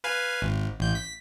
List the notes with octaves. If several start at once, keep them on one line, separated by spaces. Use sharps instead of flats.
B4 F5 G#5
G#1
A1 G6
B6